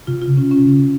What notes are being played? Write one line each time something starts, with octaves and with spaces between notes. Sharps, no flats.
C3 F4
C#3 F4
C3 C#4
C#4
C#3